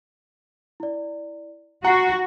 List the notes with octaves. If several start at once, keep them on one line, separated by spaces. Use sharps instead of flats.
E4 D5
F#4 F#5 A#5 C7